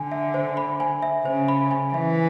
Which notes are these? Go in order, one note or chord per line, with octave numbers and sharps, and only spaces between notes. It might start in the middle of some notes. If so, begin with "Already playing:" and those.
Already playing: D3 G#5
E5
C5
B5
G#5
E5
C#3 C5
B5
G#5
E3 E5